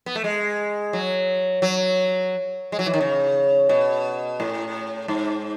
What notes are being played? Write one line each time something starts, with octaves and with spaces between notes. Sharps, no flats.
B3
A3
G#3
F#3
F#3
G#3
F#3
E3
D#3
C#3
B2
A2
G#2